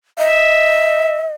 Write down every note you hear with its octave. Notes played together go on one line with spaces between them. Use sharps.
D#5 E5